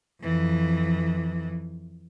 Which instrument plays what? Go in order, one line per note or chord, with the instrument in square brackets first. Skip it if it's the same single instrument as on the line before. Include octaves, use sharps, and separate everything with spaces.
[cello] F2 E3